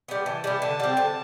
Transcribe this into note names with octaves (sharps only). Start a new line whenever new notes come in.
G3 B3
E3 A5
G3 B3
D3
G3 C4
D3